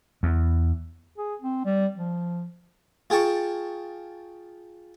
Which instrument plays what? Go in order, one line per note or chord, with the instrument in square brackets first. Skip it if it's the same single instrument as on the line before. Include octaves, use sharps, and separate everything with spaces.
[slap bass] E2
[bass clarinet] G#4
C4
G3
F3
[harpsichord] F4 G#4 G5 A5 C#6